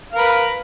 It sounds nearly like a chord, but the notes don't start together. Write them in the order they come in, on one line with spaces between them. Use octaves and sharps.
F5 A#4 B4